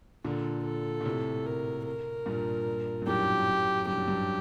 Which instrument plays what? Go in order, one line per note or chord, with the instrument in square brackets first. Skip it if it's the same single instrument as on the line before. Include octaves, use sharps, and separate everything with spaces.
[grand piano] A#2 D3 [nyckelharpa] A4
[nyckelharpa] A4
[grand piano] A#2
A2 C3
[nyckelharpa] A#4
A#4
[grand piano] G2 A#2
G2
[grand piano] F#2 A2 [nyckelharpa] G4
[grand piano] G2 [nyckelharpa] G4
[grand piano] F#2
G2